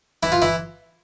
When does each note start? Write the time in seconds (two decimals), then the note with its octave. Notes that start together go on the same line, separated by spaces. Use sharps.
0.23 E3 E4
0.32 F4
0.42 E3 E4